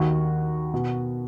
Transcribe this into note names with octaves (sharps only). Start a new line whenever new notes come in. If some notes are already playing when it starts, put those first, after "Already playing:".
Already playing: D#2 D#3 F#4
B2